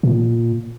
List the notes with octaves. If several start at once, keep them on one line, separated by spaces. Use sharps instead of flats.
A#2